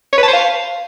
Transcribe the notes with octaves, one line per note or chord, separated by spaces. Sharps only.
C#5
B4
A5
C5
F5